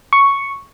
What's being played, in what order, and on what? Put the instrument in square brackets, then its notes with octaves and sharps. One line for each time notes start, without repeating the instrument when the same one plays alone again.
[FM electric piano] C#6